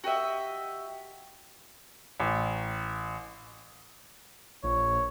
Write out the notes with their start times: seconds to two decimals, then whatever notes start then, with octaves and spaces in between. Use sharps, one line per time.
0.04 F#4 G4 D#5 E5
2.20 A1
4.63 A#1 C#5